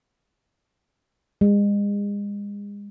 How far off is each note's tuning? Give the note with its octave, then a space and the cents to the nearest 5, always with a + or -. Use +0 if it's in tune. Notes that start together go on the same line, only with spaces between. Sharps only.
G#3 -35